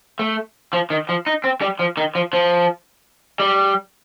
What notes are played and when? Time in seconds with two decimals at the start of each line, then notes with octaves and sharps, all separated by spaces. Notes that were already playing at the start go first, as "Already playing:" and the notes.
0.19 A3
0.73 F3
0.90 D#3
1.09 F3
1.26 D#4
1.44 C4
1.61 G3
1.79 F3
1.97 D#3
2.15 F3
2.33 F3
3.40 G3